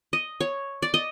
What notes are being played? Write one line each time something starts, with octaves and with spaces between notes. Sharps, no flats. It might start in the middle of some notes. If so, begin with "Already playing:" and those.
D#5
C#5
D5
D#5